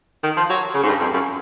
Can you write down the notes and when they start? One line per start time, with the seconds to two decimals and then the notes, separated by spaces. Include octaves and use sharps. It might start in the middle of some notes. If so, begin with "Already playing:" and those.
0.23 D#3
0.37 F3
0.50 F#3
0.74 C#3
0.83 G#2
0.88 G2
1.01 F2
1.13 F#2